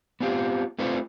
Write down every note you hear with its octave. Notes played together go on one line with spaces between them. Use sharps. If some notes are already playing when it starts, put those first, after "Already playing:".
B3 C4 F4 G4
A3 C4 F4 B4 C5